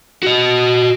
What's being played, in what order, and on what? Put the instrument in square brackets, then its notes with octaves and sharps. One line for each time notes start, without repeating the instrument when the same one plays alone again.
[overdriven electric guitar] F#4 D#5